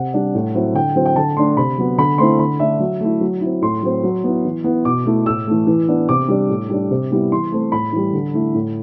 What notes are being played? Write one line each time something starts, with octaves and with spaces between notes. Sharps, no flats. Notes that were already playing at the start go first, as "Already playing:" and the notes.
Already playing: C3 F#5
G3 D4
A2
F#3 C4 E4
D3 G5
F#3 C4 E4
G5
D3 A5
A3 D4 C6
C3 B5
F#3 B3
D3 B5
A3 C4 E4 C6
D3 B5
A3 D4 E5
F#3
A3 E4
F#3
C4 E4
A2 C6
F#3 C4
F#3
B3 E4
E3
B3 E4
B2 D6
A3 E4
A2 E6
E3 A3
E3
B3 D4
C3 D6
G3 D4
A2
G3 D4
C3
G3 B3 E4
E3 C6
A3 C4
A2 B5
E3 G3
D3
A3 E4
A2